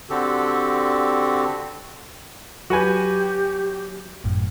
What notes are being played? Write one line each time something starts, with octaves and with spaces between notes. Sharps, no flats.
D3 C4 F#4 G4 A4
F#3 F#4 G4 B4 G#5
G#1 F#2 A2